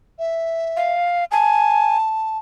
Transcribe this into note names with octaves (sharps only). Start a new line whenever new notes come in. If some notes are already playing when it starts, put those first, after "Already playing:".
E5
F5
G#5 A5